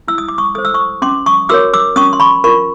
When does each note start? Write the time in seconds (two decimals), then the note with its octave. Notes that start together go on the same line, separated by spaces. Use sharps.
0.08 E4 E6
0.18 D#6
0.28 D6
0.38 C#6 D#6
0.55 A4 C5 D#6
0.65 E6
0.74 C#6 D#6
1.02 C#4 C6 D6
1.26 C#6 D#6
1.49 F#4 A#4 C#5 D6 E6
1.74 D6 E6
1.96 C#4 C#6 D#6
2.13 C6
2.20 B5 C#6
2.44 F4 A#4 B5 C#6